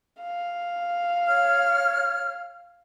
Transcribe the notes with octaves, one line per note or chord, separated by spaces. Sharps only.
F5
C#5 F6